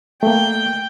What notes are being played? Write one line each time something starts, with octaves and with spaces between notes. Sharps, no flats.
A3 A#3 G5